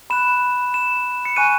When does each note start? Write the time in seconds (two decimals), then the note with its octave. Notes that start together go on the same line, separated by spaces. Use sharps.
0.10 B5 F#6 E7
0.74 E7
1.25 C#7
1.36 G#5 C#6 F#6 D#7